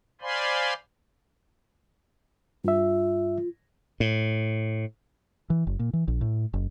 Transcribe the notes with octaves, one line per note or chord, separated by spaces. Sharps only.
C5 D5 F5 G#5 B5 C6
G2 F4 E5
A2
E3
F#1
A#2
E3
A#1
A2
F#1